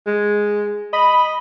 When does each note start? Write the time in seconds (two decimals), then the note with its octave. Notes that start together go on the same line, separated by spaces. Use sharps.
0.07 G#3
0.93 D#5 B5